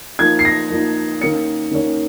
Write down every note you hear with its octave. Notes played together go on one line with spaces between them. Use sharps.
F3 A#3 D#4 G#6
C7
A#6
F3 A#3 D#4
D#3 A#3 C#4 C#7
D#3 A#3 C#4